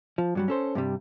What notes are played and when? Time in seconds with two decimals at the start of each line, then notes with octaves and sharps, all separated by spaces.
0.18 F3
0.35 G2 F#3 G3
0.48 C#4 A4 C5
0.75 G2 C3 G3